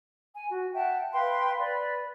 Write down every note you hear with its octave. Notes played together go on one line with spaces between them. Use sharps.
G#5
F#4
E5 F#5 G5 A5
B4 F5 G5 C6
B4 D5